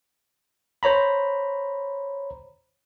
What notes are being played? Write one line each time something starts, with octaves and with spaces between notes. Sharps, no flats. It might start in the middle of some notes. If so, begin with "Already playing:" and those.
C5 C#5 A#5 B5